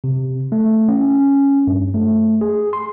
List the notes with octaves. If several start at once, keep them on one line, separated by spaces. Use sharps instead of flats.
C3
A3
C#4
G2
A3
G#4
C6